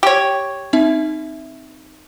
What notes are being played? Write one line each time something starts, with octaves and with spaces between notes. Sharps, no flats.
G4 C#5
C4 D#4 E5